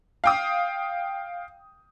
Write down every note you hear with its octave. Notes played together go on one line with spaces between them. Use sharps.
F5 G5 D#6